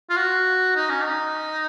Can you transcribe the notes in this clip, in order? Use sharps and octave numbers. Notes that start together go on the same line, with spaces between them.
F4
F#4
D#4
C#4
D#4